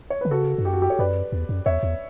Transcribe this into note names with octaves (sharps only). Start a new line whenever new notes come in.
C#5
D3 B4
C#3 F#4 A4
G2
F#2 G4
F#4
G4
A4 C#5
F#2 B4 D5
E2
F#2
E2 C#5 E5
E2